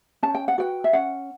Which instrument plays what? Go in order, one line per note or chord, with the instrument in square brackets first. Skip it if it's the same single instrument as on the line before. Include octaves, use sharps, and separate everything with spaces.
[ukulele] C#4 A5
G5
F#5
F#4 B4 G5
E5
C#4 F#5